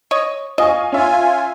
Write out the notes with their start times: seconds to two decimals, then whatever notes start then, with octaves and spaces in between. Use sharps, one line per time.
0.11 C#5 D#5
0.58 F4 D#5 G#5 C#6
0.92 C#4 F4 E5 F5 G#5